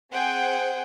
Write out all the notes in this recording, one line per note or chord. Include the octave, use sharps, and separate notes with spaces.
C4 G#4 C5 F#5 G5